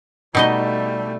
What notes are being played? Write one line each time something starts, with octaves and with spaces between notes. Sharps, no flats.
B2 G3 A3 D#4 D#5